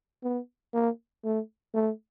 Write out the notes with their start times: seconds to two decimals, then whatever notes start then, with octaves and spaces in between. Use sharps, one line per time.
0.23 B3
0.74 A#3
1.24 A3
1.74 A3